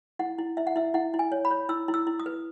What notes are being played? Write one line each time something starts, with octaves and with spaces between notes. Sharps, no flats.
E4 F#5
E4
E4 E5
F#5
E4 E5
E4 F#5
E4
G#5
C#5
B5
C#5
E4 E6
E4
E6
E4
D#6
B4